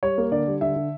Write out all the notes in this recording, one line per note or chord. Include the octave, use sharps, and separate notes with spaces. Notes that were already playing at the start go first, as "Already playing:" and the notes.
G3 C#5
A#3
D3 D5
G3
D3 E5
D3